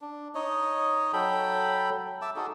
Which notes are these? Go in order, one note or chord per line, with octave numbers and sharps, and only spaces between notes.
D4
D#4 C#5 D#5
F#3 A4 G5 B5
E5 A5 D6 E6
D#4 F#4 G#4 A4